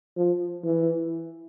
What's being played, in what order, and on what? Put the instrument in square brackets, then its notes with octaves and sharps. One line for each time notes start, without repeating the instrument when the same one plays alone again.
[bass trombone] F3
E3